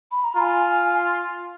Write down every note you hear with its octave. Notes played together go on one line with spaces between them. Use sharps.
B5
A#5
F4 G#5 A#5